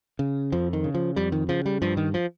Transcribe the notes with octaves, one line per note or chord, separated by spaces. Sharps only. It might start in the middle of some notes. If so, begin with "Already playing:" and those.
C#3
F2 F3
D#3
C#3
F3
F2 G3
D#3
C#3 F3
G3
G2 F3
D#3
F3